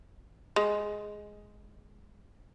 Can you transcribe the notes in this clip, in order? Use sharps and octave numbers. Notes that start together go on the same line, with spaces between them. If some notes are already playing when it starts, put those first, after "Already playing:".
G#3